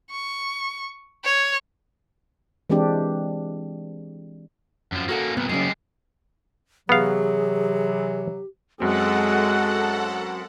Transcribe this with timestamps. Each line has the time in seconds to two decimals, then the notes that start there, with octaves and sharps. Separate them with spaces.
0.10 C#6
1.24 C#5
2.70 E3 G#3 C4 D4 G4
4.92 F#2 F3
5.09 A#3 C#4 F#4 A4 F#5
5.37 C2 A#2 B3
5.49 F#2 C#3 G3 G#3
6.89 C3 E3 F#3 B3 G4 G#4 F5
8.80 F#2 G#3 C4 F#4 A4 F#5